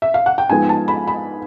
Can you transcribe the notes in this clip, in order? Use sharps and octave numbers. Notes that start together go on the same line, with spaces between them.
E5
F5
F#5
G5
G#2 F3 G#3 B3 G#5
A5
B5
B5